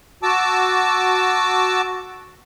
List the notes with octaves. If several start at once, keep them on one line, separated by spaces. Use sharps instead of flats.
F#4 A5 D6 E6